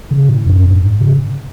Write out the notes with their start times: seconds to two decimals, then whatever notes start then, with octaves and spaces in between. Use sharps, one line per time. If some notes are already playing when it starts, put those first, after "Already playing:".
0.11 C#3
0.29 A2
0.47 F#2
0.66 G#2
1.01 C#3